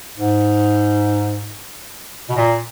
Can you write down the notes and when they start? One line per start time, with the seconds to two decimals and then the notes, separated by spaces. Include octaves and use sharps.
0.18 G#2
2.29 B2
2.36 A#2